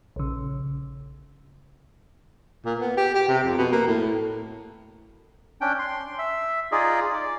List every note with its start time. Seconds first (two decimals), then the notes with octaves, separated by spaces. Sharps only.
0.16 A#1 C#3
2.65 A#2
2.79 B3
2.97 G4
3.14 G4
3.28 C3
3.43 F2
3.58 B2
3.72 A#3
3.87 A2
5.61 C#4 D4 G5
5.79 C6
6.19 E5
6.72 D#4 F4 G#4 D5 D#5
7.13 D5